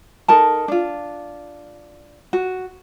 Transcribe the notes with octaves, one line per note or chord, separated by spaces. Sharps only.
D#4 A4 A#4 A5
D4 F4
F#4